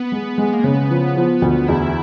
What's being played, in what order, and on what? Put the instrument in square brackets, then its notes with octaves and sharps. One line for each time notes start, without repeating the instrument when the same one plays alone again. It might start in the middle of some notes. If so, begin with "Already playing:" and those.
Already playing: [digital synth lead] B3
[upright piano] G#3
G#3
[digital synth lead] A#3
[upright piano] C#3 [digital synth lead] B3
[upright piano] F3
F3
D2
[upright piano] E2 [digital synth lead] E4